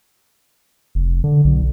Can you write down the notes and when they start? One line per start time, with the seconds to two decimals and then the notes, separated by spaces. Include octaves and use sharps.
0.95 F1
1.24 D3
1.44 B1